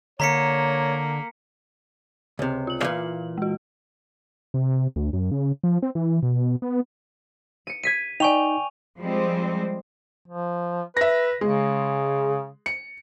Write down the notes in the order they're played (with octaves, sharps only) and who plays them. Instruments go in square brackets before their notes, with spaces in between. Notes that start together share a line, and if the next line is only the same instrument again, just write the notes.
[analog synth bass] D3 [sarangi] A#3 [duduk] C#5 [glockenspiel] A#5 B6 C#7
[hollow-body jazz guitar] C#2 C3
[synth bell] F4 F#7
[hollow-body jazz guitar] A#2 E3 F5
[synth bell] G#3 F#4
[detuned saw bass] C3
D2
F#2
C#3
F3
C4
E3
B2
B3
[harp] C#7 D#7
[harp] G#6 B6 C7 [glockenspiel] D#7
[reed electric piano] D#4 [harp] D5 G5 [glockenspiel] G#5 C#6 F7
[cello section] F3 G3 G#3 C4
[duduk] F3
[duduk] B4 [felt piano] E5 A#6
[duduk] C#3 [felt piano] G#3
[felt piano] C#7